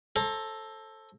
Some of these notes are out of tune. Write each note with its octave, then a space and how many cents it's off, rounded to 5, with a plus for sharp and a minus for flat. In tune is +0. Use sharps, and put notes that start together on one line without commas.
A4 +0 C5 +35 A#5 +0